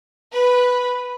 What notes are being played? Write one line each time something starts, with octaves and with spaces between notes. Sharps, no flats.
B4